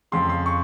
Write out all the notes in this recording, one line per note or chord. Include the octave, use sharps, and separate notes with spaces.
F2 C#3 C6
C6
C#6